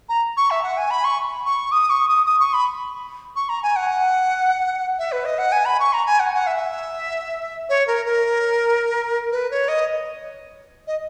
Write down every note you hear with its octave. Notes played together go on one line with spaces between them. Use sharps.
A#5
C#6
E5
F#5
G#5
B5
C#6
C#6
D#6
C#6
D#6
D#6
C#6
B5
C#6
A#5
G#5
F#5
E5
B4
D#5
F#5
G#5
B5
C#6
A#5
G#5
F#5
F#5
E5
C#5
A#4
A#4
B4
C#5
D#5
D#5